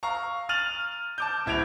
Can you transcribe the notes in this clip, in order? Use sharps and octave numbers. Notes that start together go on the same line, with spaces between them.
F5 A#5 C#6
F6 A6 D#7 F7 F#7
A5 D6 G6
D1 E4 G#6 D7 F7